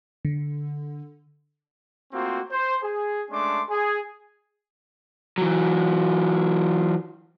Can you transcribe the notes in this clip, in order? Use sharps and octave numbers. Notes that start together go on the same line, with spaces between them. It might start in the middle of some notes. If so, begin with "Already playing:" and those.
D3
A3 A#3 C4 F4 F#4 C5
C5
G#4
G#3 A3 C#4 D4 C6 D6
G#4
E3 F#3